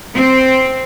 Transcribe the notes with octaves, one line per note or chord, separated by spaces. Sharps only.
C4